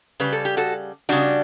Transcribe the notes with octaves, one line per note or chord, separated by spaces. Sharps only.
C#3 G3 B4
A4
G4
F#4 A4
C#3 G3 D4 F#4